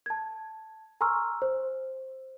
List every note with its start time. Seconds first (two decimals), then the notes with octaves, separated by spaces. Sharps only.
0.06 A5 G#6
1.01 G#5 A#5 C6 C#6 E6 F6
1.42 C5